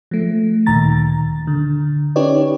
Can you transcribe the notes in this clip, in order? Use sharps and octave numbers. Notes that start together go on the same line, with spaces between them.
F3 A3
D2 A#2 D#3 A#5 A6
D3
C#4 D#4 G4 B4 C#5 D5